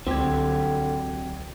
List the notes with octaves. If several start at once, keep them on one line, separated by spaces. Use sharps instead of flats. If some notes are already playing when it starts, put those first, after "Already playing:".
C#2 D3 F#3 C4 G4 G#6